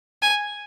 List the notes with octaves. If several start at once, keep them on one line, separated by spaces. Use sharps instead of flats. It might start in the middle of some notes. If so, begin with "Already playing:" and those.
G#5